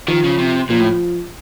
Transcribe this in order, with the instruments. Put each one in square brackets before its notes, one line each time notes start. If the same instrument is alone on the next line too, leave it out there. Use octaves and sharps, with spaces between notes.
[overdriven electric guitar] D#3 [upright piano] F3
[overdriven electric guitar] C#3
C3
[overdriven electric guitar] A#2 [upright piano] F3
[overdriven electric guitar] A2